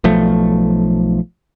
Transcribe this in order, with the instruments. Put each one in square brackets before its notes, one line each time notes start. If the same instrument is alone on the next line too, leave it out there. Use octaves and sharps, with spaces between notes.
[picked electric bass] B1 F3 A3